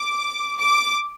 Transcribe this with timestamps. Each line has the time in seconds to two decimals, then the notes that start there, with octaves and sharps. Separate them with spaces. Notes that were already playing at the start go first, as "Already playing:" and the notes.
Already playing: D6
0.59 D6